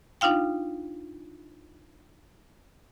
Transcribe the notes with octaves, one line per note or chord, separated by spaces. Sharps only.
D4 D#4 F4 F5 G5